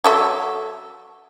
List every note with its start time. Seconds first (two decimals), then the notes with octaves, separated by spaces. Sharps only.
0.04 F#3 A4 E5